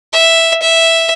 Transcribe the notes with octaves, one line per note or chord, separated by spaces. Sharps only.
E5
E5